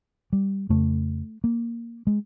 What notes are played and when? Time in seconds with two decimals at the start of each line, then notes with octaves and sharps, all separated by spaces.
0.33 G3
0.69 F2 C#3 A3
1.44 A#3
2.07 G#3